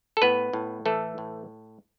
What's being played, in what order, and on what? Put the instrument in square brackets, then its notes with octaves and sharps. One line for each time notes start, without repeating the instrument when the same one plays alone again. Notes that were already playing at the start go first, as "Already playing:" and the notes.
[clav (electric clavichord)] A4
A2 B3 B4
A2
E3 A3 A4
A2